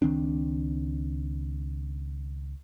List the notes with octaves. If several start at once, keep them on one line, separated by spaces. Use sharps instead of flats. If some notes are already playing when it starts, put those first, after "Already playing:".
C#2 D#3 C4 D4